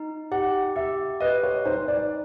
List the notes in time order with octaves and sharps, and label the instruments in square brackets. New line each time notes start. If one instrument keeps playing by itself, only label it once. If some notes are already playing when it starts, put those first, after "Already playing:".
Already playing: [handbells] D#4
[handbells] G4 [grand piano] F#5
[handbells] G4 [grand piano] E5
[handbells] B4 [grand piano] D#5
[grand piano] C#5
[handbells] D#4 [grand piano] C5
[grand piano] D5